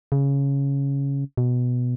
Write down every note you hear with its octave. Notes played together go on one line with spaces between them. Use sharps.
C#3
B2